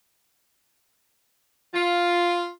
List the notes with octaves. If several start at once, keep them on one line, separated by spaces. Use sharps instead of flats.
F4